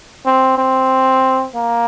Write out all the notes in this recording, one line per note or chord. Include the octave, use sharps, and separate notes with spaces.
C4
C4
A#3